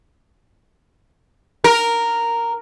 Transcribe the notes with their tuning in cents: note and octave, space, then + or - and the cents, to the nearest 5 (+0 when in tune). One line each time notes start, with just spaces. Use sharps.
A#4 -5